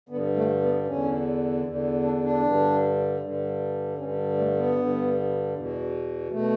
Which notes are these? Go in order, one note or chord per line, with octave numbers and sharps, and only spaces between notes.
G2 D3 B3
A3
B3
E2 D3 C#4
E2 D3
D4
D4
G2 D3
G2 D3
G2 D3 C#4
A3
B3
G2 D3
E2 B2
B2 A3